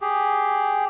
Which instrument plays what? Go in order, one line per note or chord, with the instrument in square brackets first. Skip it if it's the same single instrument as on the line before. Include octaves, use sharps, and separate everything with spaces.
[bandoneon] G4 G#4